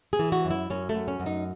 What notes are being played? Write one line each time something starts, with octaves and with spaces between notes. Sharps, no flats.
G#4
E3
F#4
F#2
E4
F#2 C#4
A3
F#2
C#4
F#2
D#4